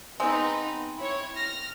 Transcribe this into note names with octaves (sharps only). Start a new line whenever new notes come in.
G#3 B3 C4 D#4 B4
E4 C#5
F6 A#6